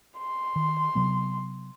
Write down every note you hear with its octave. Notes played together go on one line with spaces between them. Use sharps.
C6
D#3
C3 F#3 B3